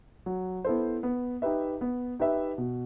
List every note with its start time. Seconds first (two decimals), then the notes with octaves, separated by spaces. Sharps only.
0.26 F#3
0.64 B3 E4 A4 C5
1.03 B3
1.42 D#4 G4 B4 E5
1.81 B3
2.19 D#4 G4 B4 E5
2.58 B2